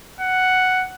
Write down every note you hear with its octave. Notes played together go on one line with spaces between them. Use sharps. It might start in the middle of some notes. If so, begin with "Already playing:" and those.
F#5